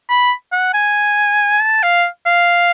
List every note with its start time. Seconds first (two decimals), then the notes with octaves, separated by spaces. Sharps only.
0.09 B5
0.52 F#5
0.74 G#5
1.61 A5
1.83 F5
2.26 F5